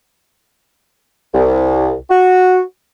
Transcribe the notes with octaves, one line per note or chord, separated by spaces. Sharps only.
C2
F#4